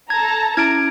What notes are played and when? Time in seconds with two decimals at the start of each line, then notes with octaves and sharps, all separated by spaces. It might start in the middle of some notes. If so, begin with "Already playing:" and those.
0.10 A4 A5 A#5 G#6
0.57 C#4 E4 F6 G#6 D7